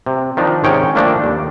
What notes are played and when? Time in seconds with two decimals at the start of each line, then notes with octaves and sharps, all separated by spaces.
0.06 C3
0.37 D#3 F3 D4 D#4
0.64 G#2 C3 D#3 C#4 C#5 G5
0.95 D#3 F3 A3 A#3 D4
1.24 D#2